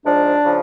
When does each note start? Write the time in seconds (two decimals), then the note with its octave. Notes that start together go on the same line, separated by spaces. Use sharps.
0.04 G#2 F3 D4
0.44 C#3 F3